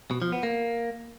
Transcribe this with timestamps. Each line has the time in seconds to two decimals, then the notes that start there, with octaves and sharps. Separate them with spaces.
0.11 B2
0.22 F3
0.32 B3
0.43 A#3